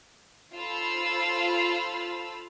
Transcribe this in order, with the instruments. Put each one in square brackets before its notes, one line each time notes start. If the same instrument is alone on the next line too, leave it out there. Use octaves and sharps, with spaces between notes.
[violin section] F4 A4 C5 F5 B5 E6